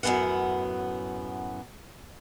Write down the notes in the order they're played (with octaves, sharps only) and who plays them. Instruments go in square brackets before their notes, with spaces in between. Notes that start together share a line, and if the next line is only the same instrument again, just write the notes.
[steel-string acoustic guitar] F#2 A2 C#3 B3 F#5